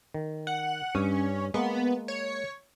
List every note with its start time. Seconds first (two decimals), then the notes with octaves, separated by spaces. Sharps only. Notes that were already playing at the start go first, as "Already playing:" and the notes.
0.14 D#3
0.47 F#5
0.95 G2 C#4
1.54 G#3 A#3 B3
2.08 C#5